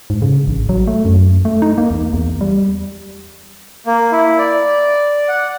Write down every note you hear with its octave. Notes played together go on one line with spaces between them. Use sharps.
G#2
C#3
A1
F#3
A3
F#2
A3
D#4
A#3
E2
E2
G3
A#3
E4
D5
F#5